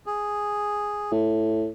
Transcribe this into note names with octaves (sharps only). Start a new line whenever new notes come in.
G#4
A2